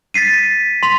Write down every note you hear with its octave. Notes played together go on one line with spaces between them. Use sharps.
A6 B6 C7 D#7
C6 B6 F7